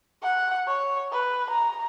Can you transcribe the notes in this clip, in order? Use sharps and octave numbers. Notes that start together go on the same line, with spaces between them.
F#5
C#5
B4
A#5